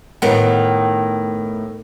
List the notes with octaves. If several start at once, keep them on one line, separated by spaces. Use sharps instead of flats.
A2 D#3 B3